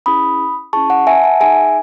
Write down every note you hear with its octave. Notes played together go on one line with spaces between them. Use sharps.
C#4 E4 G#4 B5 D#6
C#4 E4 G#4 A5 C#6
F#5 A5
E5 G#5
F#5 A5
D#4 G#4 E5 G#5